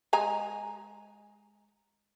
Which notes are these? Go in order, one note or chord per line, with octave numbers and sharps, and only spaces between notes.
G#3 G#5 A#5